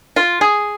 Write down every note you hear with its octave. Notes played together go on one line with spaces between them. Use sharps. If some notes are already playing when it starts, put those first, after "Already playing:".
F4
G#4